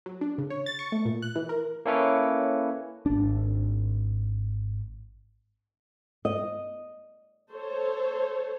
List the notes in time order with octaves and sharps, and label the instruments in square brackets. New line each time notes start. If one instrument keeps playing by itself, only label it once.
[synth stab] F#3
D4
C#3
C#5
A6
C#6
A3
A#2
F#6
E3
A#4
[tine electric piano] A#3 C#4 E4 A4 B4 C#5
[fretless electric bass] G#1 D4
[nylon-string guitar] D#5
[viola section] A4 C5 C#5